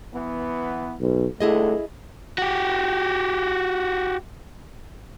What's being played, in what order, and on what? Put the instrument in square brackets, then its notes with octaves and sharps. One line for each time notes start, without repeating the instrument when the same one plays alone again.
[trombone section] E3 B3
[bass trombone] B1
[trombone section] C#2 G2 D3 [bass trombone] A3 [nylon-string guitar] E4 G#4 D#5
[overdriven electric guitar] F#4 G4